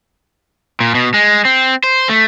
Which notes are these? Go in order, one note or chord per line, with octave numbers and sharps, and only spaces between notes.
A#2
B2
G#3
C4
C5
A3